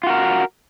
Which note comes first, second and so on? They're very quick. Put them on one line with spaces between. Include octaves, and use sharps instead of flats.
F4 F#4 A#4